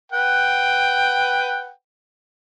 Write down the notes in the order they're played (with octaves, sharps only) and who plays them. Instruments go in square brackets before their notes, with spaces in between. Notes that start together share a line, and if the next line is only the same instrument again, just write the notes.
[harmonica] B4 F#5 G5